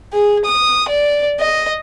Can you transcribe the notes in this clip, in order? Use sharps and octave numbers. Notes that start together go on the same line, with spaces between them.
G#4
D#6
D5
D#5